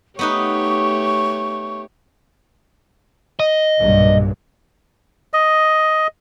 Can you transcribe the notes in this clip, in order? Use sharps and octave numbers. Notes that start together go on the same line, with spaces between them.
A3 B3 D#4 G4 B4 C#5 C#6
D#5
B1 G2 A#2
D#5